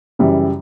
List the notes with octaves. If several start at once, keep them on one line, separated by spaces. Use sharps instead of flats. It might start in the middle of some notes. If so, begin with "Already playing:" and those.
F#2 C#3 E3 G3